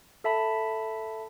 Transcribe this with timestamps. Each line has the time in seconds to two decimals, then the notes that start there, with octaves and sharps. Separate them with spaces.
0.24 A4 E5 A5 B5